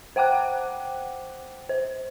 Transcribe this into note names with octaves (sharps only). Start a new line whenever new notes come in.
C5 F#5 G5 D6 F#6
C5